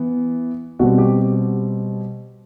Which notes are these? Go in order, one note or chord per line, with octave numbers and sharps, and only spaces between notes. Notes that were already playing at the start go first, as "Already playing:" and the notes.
Already playing: E3 B3
B2 G3 C4 F#4
G4